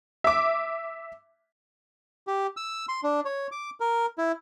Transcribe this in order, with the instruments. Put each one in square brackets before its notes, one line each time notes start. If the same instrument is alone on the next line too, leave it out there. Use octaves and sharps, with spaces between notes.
[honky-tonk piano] E5 D6
[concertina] G4
E6
C6
D4
C#5
D6
A#4
E4